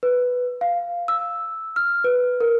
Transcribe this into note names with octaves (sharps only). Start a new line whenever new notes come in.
B4
F5
E6
F6
B4
A#4